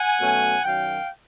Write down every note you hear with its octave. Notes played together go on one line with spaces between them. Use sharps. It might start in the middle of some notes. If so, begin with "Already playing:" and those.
Already playing: F#5 G#5
B2 F#3 A3 C#4
F#2 D#3 F#3 F5 G5